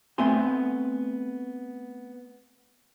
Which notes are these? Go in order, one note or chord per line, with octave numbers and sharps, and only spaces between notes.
A3 B3 C4 G#5 C6